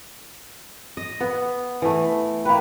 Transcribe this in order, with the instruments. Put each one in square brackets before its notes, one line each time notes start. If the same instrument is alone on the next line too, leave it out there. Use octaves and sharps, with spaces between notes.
[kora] D#5
B3
E3 A3
[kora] A#3 B4 [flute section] G5 B5